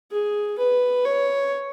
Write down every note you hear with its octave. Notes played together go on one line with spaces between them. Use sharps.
G#4
B4
C#5